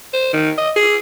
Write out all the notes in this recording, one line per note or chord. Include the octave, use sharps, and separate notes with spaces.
C5
D#3
D#5
G#4